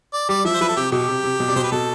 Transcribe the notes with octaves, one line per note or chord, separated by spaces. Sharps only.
D5
G3 D5
F3 E5
C5
F3 B4
A4
C3 G4
B2 G4
C3
C3
B2
C3 D5
B2 C5
B4
B2 A4